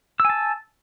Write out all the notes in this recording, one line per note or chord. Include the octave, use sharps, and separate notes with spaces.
G#5 A5 E6